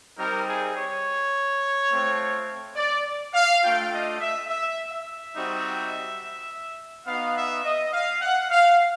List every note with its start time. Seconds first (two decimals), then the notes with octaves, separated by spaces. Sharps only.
0.18 G3 C4 D#4 A#4
0.47 G#4
0.76 C#5
1.90 A3 C4 F4
2.76 D5
3.34 F5
3.63 A3 D4 F4 G5
3.92 D#5
4.20 E5
4.48 E5
4.92 E5
5.35 G3 C4 D#4 F#4
7.07 B3 D#4 F#4 F5
7.36 E5
7.65 D#5
7.93 F5
8.22 F#5
8.51 F5